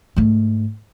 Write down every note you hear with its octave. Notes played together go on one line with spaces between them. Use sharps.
G#2 A3